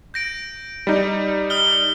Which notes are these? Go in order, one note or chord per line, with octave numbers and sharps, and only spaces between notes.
G6 A#6 D7
G3 D#4
D#6 F6 G7